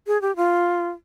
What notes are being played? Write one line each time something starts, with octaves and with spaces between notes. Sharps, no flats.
G#4
G4
F4